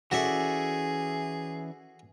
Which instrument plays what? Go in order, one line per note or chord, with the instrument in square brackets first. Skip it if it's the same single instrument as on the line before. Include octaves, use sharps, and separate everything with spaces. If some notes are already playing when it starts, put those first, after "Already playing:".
[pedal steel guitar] E3 C#4 D5 [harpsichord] F#4 A4 E5 [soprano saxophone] G#4